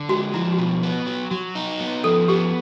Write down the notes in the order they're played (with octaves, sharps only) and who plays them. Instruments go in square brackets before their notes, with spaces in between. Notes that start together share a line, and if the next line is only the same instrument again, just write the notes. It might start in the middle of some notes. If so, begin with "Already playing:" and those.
Already playing: [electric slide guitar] D3
[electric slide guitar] G#3 [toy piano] F#4
[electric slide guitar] F3 [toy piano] E4
[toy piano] F#4
[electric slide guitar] B2 [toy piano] F4
[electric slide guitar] B3
F#3
[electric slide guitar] F#3 [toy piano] F#4
[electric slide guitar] D#4
B3
[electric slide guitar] F3 [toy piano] A4
[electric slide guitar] B3 [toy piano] G4